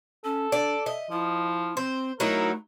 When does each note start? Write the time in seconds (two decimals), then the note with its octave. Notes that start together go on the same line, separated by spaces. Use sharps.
0.24 C#4 A4
0.52 D4 D5
0.86 D#5 E5
1.11 F3 E4
1.77 C4 C5
2.20 F#3 A3 D#4 E4 A#4